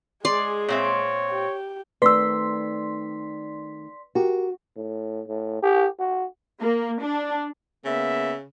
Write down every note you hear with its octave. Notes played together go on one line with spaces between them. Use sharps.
G#3 G#4 D5 C6
A#2 C4 C#5 E5
G4
D#3 A3 C4 B4 D5 C6 E6 B6
F#4 G4 A#4
A2
A2
G4
F#4
A#3
D4
C#3 A#3 B3 E5